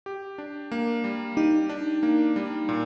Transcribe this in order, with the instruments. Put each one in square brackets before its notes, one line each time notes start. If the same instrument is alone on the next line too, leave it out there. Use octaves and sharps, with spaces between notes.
[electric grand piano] G4
D4
A#3
G3
[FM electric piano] D#4 [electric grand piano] G4
[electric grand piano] D4
A#3
G3
A#2